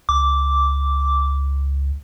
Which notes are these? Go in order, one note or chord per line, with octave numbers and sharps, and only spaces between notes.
C#2 D6